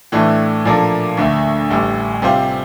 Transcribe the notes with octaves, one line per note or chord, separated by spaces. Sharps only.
A2 E3 A3 D4
A#2 F3 A#3 D4 A4
D2 D3 A3
A1 A2 G3
C3 G3 C4 F4 C5